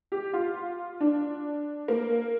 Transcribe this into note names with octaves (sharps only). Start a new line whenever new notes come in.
G4
F4
D4
A#3